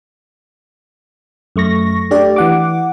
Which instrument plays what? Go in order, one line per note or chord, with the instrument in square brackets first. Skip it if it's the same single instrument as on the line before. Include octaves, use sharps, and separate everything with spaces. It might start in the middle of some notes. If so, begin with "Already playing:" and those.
[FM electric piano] F#2 A3 C#6 A#6
A3 D4 G4 D5
E3 F#5 D6